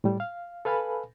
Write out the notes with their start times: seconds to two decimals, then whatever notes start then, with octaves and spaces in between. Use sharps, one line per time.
0.04 A2 G3
0.20 F5
0.65 A4 B4 F5 G#5 A5 B5